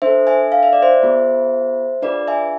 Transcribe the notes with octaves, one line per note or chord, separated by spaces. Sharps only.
D4 A4 C5 E5
E5 G#5
F5
E5
D5
C5 E5
B3 F4 G#4
D4 F4 G#4 B4 D5
E5 G#5